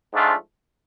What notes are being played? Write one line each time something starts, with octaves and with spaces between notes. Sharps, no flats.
G#2 F3 A3 D4 F4